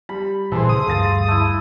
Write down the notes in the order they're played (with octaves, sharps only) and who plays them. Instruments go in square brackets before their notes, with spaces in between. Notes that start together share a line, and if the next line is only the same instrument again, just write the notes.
[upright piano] G3 [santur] B5
[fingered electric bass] A#2 [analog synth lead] E3 [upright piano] G#4 C5 [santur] A4 C6
[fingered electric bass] C#3 [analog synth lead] D#6
[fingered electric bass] D2 G2 [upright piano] G#4 F5 A6
[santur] A3 E4